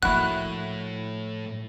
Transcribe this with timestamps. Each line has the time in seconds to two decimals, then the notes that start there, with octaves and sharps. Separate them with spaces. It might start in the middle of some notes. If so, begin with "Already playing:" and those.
0.03 A2 F3 A#3 E4 F#4 F#6